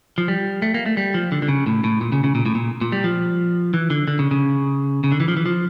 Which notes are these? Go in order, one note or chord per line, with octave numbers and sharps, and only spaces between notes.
F3
G3
A3
A#3
A3
G3
F3
D3
D3
C#3
A2
A2
A#2
C#3
C#3
A#2
A2
A#2
A#2
G3
F3
E3
D3
D3
C#3
C#3
C#3
D3
E3
F3
E3
F3